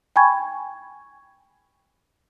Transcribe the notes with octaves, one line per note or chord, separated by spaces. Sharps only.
G5 G#5 B5 C#6 G#6